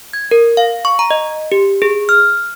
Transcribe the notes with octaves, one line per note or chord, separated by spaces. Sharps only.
G#6
A#4
F5
C#6
A#5
D#5
G4
G#4
F6